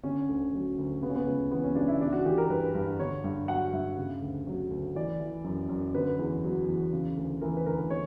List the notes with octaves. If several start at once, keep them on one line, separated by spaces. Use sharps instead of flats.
D3 C#4
D2
F#3
D2
C#3 B3
C#4
B3
C#2
E3 B3
C#4
C#2 D4
E4
E3 D4
F#4
E3 G4
A#4
G2 B4
G2
D3 C#5
G2
F#3 F#5
G2 E5
C#3
D2
F#3
D2
E3 D5
E3
F#2
F#2
D3 B4
E2
F#3
E2
C#3
D2
E3 A#4
B4
D2 A#4
D3 C#5